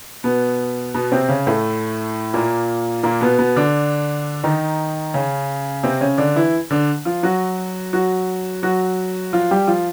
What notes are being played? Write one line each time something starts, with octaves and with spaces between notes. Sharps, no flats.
B2 B3
B2 B3
C3 C4
C#3 C#4
A2 A3
A#2 A#3
A#2 A#3
B2 B3
B2 B3
D3 D4
D#3 D#4
C#3 C#4
C3 C4
C#3 C#4
D3 D4
E3 E4
D3 D4
F3 F4
F#3 F#4
F#3 F#4
F#3 F#4
F3 F4
G3 G4
F3 F4